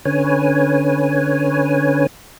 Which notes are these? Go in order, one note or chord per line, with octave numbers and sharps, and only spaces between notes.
D3 C#4 B4 C#5 G#5